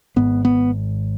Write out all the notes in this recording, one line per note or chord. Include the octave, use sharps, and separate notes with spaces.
G#1 G#2 B3
B3